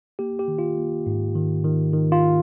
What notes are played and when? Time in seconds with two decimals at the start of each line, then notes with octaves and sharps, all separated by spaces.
0.19 A#3 G4
0.39 G4
0.48 D#3
0.59 F4
0.77 A#3
1.06 G#2
1.36 D#3
1.64 D#3
1.93 D#3
2.12 F4